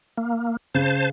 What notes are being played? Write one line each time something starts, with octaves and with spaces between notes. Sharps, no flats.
A#3
C#3 C5 A5